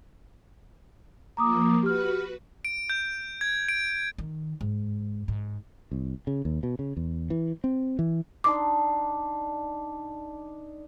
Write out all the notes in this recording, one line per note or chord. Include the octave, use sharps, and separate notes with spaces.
F3 A#3 A#5 D6 D#6
F#4 G4 B4 F6
D7
G6
G#6
D7
D#3
G#2
G#2
C2
C#3
D#2
B2
C#3
E2
E3
C4
E3
D4 D#4 C6 D6